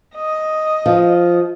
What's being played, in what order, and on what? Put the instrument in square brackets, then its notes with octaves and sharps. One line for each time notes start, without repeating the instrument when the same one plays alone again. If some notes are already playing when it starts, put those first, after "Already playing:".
[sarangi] D#5
[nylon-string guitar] F3